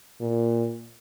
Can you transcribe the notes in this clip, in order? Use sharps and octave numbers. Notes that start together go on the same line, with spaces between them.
A#2